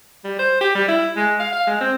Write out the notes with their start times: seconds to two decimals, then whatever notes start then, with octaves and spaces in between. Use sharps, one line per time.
0.24 G3
0.39 C5
0.61 G4
0.75 G3
0.88 E4
1.17 G#3
1.39 F5
1.52 F5
1.67 G#3
1.81 C4